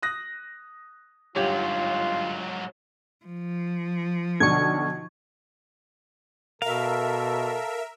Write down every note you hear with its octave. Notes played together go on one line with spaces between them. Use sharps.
D#6 F#6 A#6
G1 G#2 F#3 F4 G4 C#5
F3
B1 D3 C#6 G#6
B2 A4 A#4 E5 F5